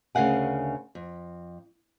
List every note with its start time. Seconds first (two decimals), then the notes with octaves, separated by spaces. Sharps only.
0.15 D2 C#3 A#4 F5 F#5 G#5
0.95 F2